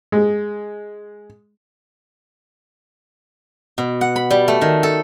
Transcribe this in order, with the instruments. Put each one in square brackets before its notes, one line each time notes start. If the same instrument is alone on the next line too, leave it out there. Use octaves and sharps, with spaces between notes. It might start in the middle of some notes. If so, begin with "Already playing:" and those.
[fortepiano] G#3
[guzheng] B2
F#5
B5
G3
A3
D#3
A4